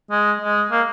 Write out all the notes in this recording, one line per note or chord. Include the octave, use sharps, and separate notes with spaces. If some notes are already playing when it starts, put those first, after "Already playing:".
G#3
G#3
A#3